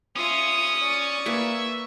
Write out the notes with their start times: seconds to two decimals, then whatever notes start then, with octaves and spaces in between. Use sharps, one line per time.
0.16 C#4 F4 E5 D#6
0.79 D5 C#6
1.26 A#3 B4 E5 G#5